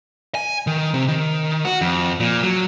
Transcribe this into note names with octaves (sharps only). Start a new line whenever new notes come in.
G#5
D#3
C3
D#3
F#4
F2
A#2
F#3